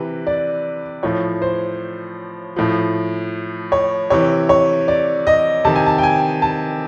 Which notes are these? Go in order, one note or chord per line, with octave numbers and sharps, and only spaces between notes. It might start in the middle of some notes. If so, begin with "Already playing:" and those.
Already playing: C3 E3 B4
D5
A2 F3 C#5
C5
A2 F3
C#5
C3 E3 C#5
C#5
D5
D#5
C3 D#3 A5
G#5
A5
G5
G#5
A5